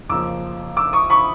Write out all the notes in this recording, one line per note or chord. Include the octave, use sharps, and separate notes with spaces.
F2 C#3 F3 A#3 D6 E6
D6 E6
C#6 D#6
B5 C#6